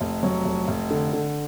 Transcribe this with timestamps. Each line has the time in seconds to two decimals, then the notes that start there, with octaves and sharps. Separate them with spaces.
0.01 F1
0.23 F#3
0.45 F1
0.68 F1
0.91 D3
1.13 D3